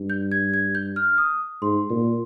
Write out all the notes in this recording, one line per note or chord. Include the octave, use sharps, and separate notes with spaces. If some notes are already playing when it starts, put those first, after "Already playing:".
Already playing: G2
G6
G#6
G#6
G6
F6
D#6
G#2 C6
A#2